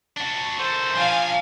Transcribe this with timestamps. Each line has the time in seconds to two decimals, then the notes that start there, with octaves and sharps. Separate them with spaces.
0.17 D4 F#4
0.59 D#3 A3 C5
0.95 F3 D4 F5 G#5